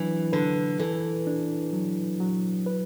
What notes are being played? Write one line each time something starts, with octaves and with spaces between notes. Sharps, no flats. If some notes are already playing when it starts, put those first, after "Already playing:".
Already playing: E3 F#3 D4
D3 B4
E3 A4
D4
F#3
F#3
B4